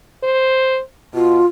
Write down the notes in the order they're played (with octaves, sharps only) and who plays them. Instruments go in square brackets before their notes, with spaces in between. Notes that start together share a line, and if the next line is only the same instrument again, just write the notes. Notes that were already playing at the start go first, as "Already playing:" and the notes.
[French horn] C5
[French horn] B2 [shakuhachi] F4